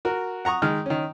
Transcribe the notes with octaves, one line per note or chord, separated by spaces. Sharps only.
F#4 A#4
F#5 A#5 C#6 D#6
D#3 G#3 F6
D#3 C#4